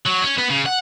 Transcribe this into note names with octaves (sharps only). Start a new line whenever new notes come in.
F#3
C#4
B3
C#3
F#5